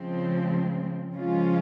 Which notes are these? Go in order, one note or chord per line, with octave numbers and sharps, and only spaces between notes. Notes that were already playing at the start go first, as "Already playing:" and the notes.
Already playing: C#3 F3 G#3 C4
C#3 F3 G#3 C#4 F4